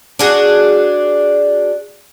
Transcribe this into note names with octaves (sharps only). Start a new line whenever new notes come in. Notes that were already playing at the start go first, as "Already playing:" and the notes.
D4 F#4 G#4